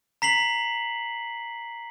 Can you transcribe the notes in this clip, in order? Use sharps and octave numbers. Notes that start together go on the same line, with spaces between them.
A#5 B6 C7 F#7